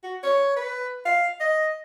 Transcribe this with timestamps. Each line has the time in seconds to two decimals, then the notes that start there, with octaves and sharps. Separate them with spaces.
0.04 F#4
0.23 C#5
0.56 B4
1.05 F5
1.40 D#5